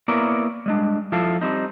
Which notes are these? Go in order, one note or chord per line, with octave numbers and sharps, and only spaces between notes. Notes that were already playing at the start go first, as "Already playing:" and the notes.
A#3 B3 E4 A#4 C#5 D5
G3 G#3 D4
F3 E4 A4 F5
G3 C4 D#4